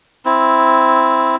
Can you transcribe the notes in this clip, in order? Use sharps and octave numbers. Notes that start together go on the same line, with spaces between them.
C4 E4